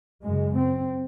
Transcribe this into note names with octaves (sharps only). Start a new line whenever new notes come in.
F#2 C#3 G#3
C4